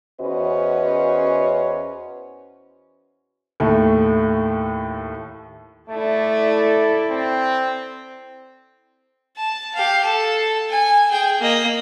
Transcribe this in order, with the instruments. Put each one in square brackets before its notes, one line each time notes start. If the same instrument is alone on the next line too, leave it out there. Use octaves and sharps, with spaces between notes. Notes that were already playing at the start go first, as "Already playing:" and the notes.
[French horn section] E2 C#4 F#4 B4 C5 D#5
[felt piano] D#2 A2 A3
[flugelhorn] A3 [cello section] E4 A4 D5
[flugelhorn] C4
[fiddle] A5
G4 F5
A4 A5
G#5
G#4 G5
A#3 D#5